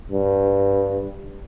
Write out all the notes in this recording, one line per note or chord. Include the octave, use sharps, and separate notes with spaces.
G2